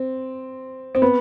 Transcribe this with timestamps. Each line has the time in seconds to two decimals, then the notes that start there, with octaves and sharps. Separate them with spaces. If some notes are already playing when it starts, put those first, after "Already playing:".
Already playing: C4
0.95 C4
1.02 B3